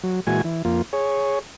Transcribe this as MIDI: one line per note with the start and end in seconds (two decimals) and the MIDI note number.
0.03 0.20 54
0.27 0.42 46
0.27 0.42 52
0.27 0.42 56
0.27 0.42 66
0.27 0.42 80
0.44 0.62 52
0.65 0.82 41
0.65 0.82 58
0.65 0.82 65
0.93 1.39 68
0.93 1.39 73